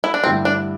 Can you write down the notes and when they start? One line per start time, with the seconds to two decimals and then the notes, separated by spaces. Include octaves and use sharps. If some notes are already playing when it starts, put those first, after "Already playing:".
0.04 E4
0.14 D4
0.23 G2 D3 A3 C4 E4 G4
0.45 D4